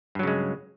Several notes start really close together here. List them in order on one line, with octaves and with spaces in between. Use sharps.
G2 F#3 C#3 G#3